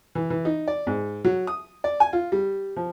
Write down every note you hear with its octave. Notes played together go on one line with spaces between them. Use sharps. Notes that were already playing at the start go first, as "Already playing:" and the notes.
E3
E3
D#4
D5
G#2
F#3
D#6
D5
G#5
F4
G3
F3